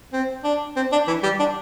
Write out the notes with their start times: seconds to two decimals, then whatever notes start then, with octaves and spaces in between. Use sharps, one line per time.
0.13 C4
0.44 D4
0.76 C4
0.92 D4
1.08 E3
1.23 G3
1.39 D4